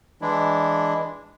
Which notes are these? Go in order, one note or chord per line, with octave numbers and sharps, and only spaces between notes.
E3 G#3 D4 E4